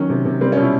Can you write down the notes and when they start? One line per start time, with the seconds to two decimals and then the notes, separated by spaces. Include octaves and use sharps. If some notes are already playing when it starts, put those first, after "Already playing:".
Already playing: D#3 F#3 C#4
0.09 C3
0.25 C3
0.41 G3 C4
0.52 C#4
0.57 B2
0.62 E4